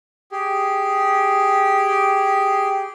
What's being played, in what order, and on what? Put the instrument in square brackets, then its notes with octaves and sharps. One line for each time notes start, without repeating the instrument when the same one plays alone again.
[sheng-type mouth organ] G4 G#4